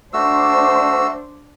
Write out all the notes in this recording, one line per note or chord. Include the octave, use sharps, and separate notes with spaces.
A3 D4 F#4 C5 E6